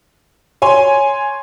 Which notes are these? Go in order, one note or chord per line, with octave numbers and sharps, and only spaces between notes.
C#5 G#5 C6